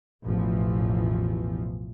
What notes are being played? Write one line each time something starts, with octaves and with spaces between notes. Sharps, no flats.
A1 E2 B2 E3 F3